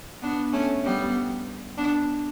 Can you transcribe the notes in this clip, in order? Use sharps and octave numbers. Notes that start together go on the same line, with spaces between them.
B3 D4
A3 C#4
G3 B3
B3 D4